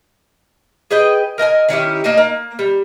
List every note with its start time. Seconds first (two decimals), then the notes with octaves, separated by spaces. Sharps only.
0.91 G#4 B4 D#5 G5
1.38 A#4 D#5 G5 G#5
1.69 D#3 C#4 E4 G4
2.04 A#3 D4 D#4 D#5
2.18 A#3
2.59 G3